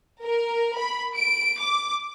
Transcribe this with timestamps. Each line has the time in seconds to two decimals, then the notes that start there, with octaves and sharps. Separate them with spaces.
0.23 A#4
0.78 B5
1.15 D7
1.61 D6